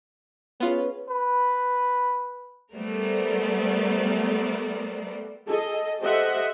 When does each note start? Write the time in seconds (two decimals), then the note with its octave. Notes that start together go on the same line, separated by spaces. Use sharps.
0.60 B3 C#4 F4 G#4 B4
1.09 B4
2.74 G3 A3 B3 A#4 C5 D5
5.47 G#4 A4 D#5
6.01 G4 A4 C5 D#5 E5 F#5